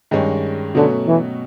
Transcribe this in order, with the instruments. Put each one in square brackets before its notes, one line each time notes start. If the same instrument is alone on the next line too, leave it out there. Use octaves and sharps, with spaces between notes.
[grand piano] G2 D#3 G#3 C#4
[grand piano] B2 F#3 A3 C#4 [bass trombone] D3
[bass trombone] E3